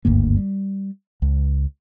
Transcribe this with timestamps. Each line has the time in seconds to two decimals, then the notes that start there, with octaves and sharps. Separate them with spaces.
0.05 F#1 D2 G2 A#3
0.37 G3
1.22 C#2